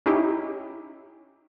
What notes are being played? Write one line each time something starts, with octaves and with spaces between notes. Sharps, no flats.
C#4 D#4 E4 G4